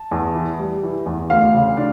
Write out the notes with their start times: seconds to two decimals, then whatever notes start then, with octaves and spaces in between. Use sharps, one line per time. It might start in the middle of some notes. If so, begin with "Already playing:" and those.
Already playing: A5
0.11 E2
0.35 E3
0.59 G3
0.83 E3
1.06 E2
1.30 D2 F5
1.54 C#3
1.77 D4